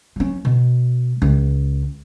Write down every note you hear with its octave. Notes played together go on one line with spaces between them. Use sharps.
F#3 C#4
B2
C#2